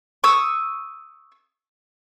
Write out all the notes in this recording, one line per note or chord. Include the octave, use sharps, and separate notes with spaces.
C#6 D#6 E6